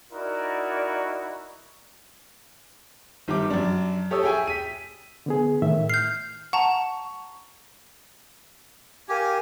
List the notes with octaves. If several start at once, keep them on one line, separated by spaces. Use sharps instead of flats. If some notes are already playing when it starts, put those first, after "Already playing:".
D#4 E4 F#4 A#4 D5
G1 D#3 G4 D6
F#2 D4
G4 A4 C#5 D#6 E6
G#4 E5 G5 G#5
B6 D#7
D3 B3 G#4
A2 D#3 E5
F6 G6 C7
F#5 A5 A#5 C#6
G4 A#4 F5 G#5